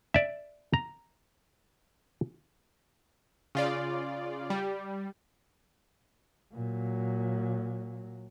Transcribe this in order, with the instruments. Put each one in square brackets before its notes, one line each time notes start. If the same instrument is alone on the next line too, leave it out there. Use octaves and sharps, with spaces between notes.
[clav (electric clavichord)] D5 E5
A#5
[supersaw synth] C#3 F4 D5
G3
[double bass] A#2 F#3